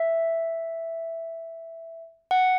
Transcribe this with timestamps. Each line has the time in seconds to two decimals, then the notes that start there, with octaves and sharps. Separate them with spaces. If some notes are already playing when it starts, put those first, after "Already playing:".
Already playing: E5
2.31 F#5